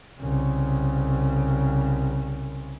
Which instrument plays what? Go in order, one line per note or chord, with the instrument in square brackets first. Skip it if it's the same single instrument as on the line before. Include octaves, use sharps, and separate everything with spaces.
[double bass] C2 C#3